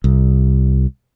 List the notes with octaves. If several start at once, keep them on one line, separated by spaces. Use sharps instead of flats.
C2